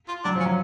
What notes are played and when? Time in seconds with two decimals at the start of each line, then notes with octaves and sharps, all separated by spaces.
0.08 F4
0.24 F#3 D4
0.35 F3
0.40 C#4
0.46 F#3